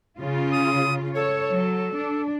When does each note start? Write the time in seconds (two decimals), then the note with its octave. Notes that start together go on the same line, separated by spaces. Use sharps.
0.19 C#3 F4
0.52 D#6
1.15 A4 C#5
1.51 F#3
1.95 D4